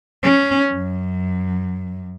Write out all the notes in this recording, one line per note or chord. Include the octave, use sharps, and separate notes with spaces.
C#4
F#2